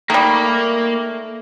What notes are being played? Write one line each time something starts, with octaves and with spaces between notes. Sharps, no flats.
D#3 G3 A3 A#3